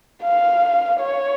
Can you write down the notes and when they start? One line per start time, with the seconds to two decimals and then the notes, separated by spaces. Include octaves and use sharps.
0.23 F5
1.01 C#5